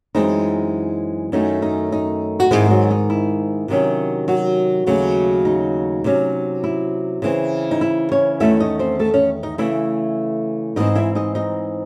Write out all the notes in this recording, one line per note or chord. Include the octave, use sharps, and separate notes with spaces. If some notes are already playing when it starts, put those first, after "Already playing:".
F#2 E3 G#3 C4 D#4
F#2 D#3 A3 C#4 D#4
D#4
D#4
F#4
G#2 D#3 G#3 C4 E4
F#3 F#4
D#4
E4
C3 D#3 F#3 C#4
F#3 F#4
D#2 C#3 F#3 A3
D#4
C3 F#3 C#4
E4
C#3 E3 C4
D#4
E4
C#4 C#5
E2 D#3 A3 C#4 E4 E5
D#4 D#5
C4 C5
A3 A4
C#4 C#5
D#4 D#5
C#3 E3 A3 E4 E5
G#2 E3 C4 D#4 D#5
E4 E5
D#4 D#5
D#4 D#5